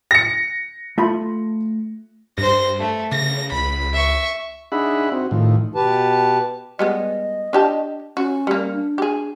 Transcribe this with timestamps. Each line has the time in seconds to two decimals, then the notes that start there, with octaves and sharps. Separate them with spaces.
0.11 A#6 C#7
0.98 A3 F4 B5
2.38 G2 C5 A#6
2.80 A3
3.11 C#3 A#6
3.52 C#2 B5
3.93 E5 C#6
4.72 D4 D#4 G#4 E5 F#5 B5
5.12 C4 F#4
5.31 A2 D#3 F3
5.75 B2 G4 B4 A5
6.79 G3 G#3 B3 D#5
7.53 D4 G4 A5
8.17 C#4 F#4
8.47 G3 A#3
8.73 D4
8.98 G4 G#4